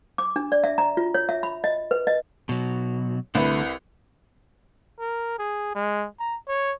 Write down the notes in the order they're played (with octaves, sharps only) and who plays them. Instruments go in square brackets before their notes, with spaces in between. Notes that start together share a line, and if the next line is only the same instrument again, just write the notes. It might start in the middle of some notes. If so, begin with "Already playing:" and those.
[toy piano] D6
D4
D5
E5
A#5
F4
C#5
E5
B5
D#5
B4
D#5
[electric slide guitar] B2 F#3
[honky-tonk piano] C2 E4 B4 [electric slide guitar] D3 A3
[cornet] A#4
G#4
G#3
A#5
C#5